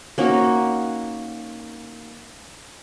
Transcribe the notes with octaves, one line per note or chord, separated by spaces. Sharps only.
A#3 C#4 D#4 F#4